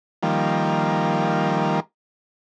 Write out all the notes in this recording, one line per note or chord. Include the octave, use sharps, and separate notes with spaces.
D#3 F3 G3 A#3